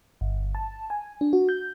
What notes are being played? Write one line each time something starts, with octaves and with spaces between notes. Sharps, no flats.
G1
A5
G#5
D4
F#4
G6